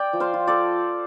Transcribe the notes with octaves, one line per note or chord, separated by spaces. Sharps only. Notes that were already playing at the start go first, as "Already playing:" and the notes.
Already playing: D5 G5
F3
C5 F5
F4
A4 D5